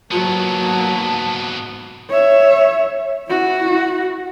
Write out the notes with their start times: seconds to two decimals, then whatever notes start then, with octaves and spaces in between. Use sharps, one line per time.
0.11 G#2 F#3 A#3 B3 A5
2.09 C#5 E5
3.29 E4 F#4